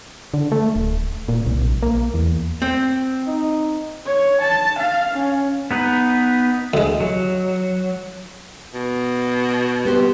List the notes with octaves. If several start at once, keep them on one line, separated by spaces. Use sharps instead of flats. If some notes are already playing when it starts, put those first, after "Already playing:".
D3
A3
D1
A#2
C2
A#1
A#3
E2
C4
D#4
C#5
A5
F5
C#4
B3 D#4 B4
D2 G#3
F#3
B2
B3 G4 C5